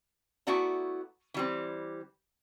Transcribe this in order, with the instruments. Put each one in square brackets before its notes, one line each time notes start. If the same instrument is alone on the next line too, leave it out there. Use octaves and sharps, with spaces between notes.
[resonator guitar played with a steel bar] A3 B3 E4 F#4 D5 A#5
E3 G3 C4